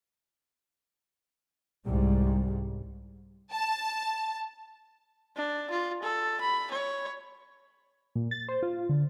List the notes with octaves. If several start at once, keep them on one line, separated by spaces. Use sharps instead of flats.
C2 G#2 G3
A5
D4
F4
A4
B5
C#5
A#2
A6
C5
F4
D3